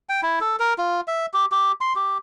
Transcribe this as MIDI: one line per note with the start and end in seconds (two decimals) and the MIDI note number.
0.09 0.21 79
0.23 0.39 64
0.41 0.56 69
0.59 0.74 70
0.78 1.01 65
1.08 1.26 76
1.33 1.46 67
1.52 1.72 67
1.81 1.93 84
1.96 2.18 67